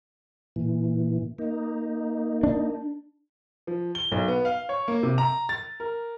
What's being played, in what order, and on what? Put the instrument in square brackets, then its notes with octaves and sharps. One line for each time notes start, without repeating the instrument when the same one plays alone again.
[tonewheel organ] A#2 E3
A#3 D#4
[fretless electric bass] D4
[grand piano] F3
G7
B1
B3
F5
C#5
A#3
C3
A#5
A6
A#4